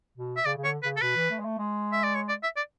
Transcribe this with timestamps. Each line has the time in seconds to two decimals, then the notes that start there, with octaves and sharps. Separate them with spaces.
0.18 B2
0.37 E5
0.46 C#3 D5
0.57 C#3
0.64 D3 C#5
0.83 C#3 B4
0.96 A4
1.02 B2 B4
1.16 E3
1.30 A3
1.39 G#3
1.45 A3
1.58 G#3
1.92 E5
2.04 D5
2.15 C#5
2.29 D5
2.43 E5
2.57 D5